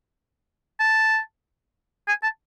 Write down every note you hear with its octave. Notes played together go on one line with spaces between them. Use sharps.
A5
G#5
A5